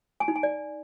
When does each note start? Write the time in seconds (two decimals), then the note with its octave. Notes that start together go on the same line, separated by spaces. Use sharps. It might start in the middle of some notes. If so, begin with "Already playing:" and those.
0.20 G#5
0.28 D#4
0.36 G#5
0.43 D5